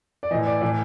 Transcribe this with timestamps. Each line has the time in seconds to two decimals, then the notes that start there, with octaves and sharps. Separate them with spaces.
0.23 D5
0.31 E3 D#5
0.34 A2
0.46 D5
0.61 A2 E3 D5